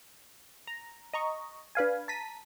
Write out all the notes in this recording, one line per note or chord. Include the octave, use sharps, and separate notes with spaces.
A#5
D#5 A#5 C#6
D4 B4 F5 G#5
A5 A#5 B6 D#7